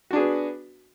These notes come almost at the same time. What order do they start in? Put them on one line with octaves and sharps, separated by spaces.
F#4 D4 G#4 B3